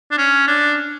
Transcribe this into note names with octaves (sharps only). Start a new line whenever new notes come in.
D4
C#4
D4